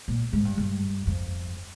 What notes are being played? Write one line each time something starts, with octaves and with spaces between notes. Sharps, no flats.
A#2
G#2
G2
G2
F2